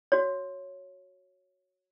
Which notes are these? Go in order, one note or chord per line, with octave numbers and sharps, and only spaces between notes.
F#4 C#5